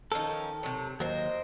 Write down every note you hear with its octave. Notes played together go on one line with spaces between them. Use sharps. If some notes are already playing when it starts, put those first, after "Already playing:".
D#3 F3 C#4 D#4 A4
C3 F#3
D#2 F#3 A#4 C5 D#5